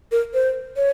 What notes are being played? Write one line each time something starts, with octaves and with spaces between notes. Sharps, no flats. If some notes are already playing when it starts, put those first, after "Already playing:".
A#4
C5
C#5